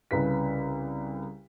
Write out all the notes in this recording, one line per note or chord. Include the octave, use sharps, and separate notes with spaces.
C2 C#3 B4 B6